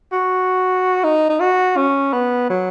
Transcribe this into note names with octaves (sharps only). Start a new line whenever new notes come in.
F#4
D#4
D#4
F#4
C#4
B3
F#3